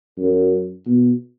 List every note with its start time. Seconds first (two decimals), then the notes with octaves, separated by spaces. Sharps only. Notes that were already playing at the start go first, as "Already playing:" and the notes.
0.18 F#2
0.87 B2